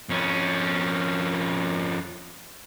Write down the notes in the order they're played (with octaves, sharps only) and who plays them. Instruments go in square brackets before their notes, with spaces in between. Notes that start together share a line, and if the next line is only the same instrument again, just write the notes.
[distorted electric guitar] F2 C#4